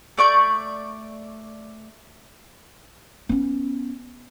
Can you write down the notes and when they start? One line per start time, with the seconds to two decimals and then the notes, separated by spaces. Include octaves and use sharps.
0.18 A3 D5 C#6 G6
3.29 B3 C#4